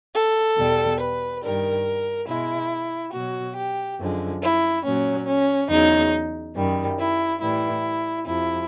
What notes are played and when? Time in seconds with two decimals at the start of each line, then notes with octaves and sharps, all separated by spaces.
0.14 A4
0.57 E2 B2 G3
0.99 B4
1.42 G2 D#3 G3 A#4
2.27 B2 G#3 E4
3.12 B2 F#3 F#4
3.55 G4
3.99 F#2 D3 F3 G#3
4.42 E4
4.84 A#2 F#3 C#4
5.27 C#4
5.69 E2 C#3 F#3 D#4
6.55 F#2 D#3 G3
6.98 E4
7.40 A2 E3 G3 E4
8.26 F2 C3 F3 E4